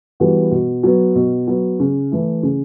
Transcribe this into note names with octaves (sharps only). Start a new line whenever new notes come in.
E3 G3 B3 F#4
B2
F#3 B3
B2
F#3 B3
C#3
E3 A3 E4
C#3